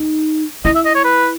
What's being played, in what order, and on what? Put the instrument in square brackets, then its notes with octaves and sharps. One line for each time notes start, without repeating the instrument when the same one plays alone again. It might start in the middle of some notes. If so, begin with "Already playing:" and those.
Already playing: [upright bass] D#4
[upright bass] E4 [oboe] D#5
[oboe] E5
D#5
C#5
B4